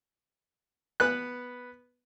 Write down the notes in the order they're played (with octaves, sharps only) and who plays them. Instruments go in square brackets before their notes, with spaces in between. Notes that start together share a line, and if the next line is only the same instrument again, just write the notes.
[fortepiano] B3 B4 F#6